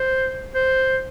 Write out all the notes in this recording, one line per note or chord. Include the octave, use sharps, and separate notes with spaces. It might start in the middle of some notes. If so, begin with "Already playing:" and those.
Already playing: C5
C5